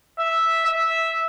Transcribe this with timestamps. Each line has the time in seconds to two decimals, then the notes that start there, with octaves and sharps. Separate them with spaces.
0.19 E5
0.66 E5